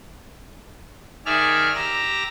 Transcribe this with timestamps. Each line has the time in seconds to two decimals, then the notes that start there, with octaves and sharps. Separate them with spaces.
1.26 D#3 G#4 D5 E5 F6
1.75 G4 A#5 E6 A#6